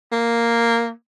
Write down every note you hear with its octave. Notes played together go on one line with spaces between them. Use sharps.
A#3